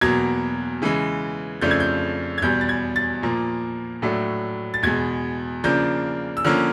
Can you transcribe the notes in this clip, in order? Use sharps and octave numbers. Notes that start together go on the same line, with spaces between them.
E2 B2 F#3 A#3 G#6
C#3 E3 G#3
F2 C#3 F3 A3 D4 G6
G#6
G6
G#6
E2 B2 G3 G6
A6
G#6
A6
A#2 F3 A#3
A2 F#3 A3 D4
A6
E2 B2 G#3 G#6
C#3 F3 A#3 D4 G6
E6
D3 F3 A#3 C#4 F6